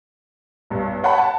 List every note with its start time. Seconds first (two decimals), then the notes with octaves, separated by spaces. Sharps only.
0.70 B1 G2
1.04 C#5 F#5 G5 A5 B5
1.18 A5